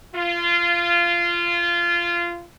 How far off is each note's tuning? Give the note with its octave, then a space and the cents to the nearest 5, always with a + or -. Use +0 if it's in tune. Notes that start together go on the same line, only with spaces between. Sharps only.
F4 -20